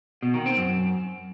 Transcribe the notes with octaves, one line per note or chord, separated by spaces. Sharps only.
B2
D#3
C4
F#2